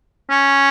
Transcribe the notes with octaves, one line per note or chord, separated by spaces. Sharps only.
C#4